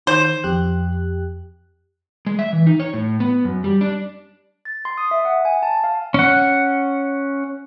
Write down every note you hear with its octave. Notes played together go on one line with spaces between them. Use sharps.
D#3 C5
F2 G4 F#6
G#3
E5
E3
D#4
C#5
A2
B3
F#2
G3
D4
A6
C6
D#6
E5
F#5
G#5
A5
F5
C#4 F#5